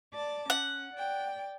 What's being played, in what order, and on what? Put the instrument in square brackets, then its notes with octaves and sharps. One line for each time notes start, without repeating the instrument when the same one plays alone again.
[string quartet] D5 A5 D6
[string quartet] C#4 [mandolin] F#5
[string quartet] D5 G5